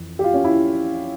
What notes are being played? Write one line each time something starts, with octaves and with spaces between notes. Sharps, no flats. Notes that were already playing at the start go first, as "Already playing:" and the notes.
Already playing: F2 E3
G4
F4
C#4
E4